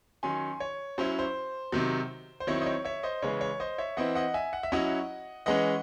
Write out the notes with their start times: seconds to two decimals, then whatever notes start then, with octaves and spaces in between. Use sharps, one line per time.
0.23 D#3 F#3 C#4 G#5 C6
0.60 C#5
0.98 F#3 C#4 E4 C5
1.19 C5
1.72 C3 D#3 F#3
2.40 C5
2.47 D#3 F#3 C4 E4 C#5
2.61 D#5
2.66 C#5
2.85 C#5 E5
3.03 C5 D#5
3.22 C#3 E3 G#3 C#5
3.41 C#5
3.60 C5 D#5
3.78 C#5 E5
3.97 E3 C4 E4 D#5 F#5
4.15 D#5 F#5
4.34 E5 G#5
4.53 F#5
4.63 E5
4.72 F#3 C#4 E4 D#5 F#5
5.46 E3 G#3 C#4 D#5 F#5